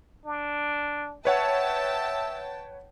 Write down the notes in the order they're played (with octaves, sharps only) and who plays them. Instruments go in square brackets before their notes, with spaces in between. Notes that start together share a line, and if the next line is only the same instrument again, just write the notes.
[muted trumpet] D4
[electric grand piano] B4 C#5 F#5 [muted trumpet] E5 [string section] G5 A5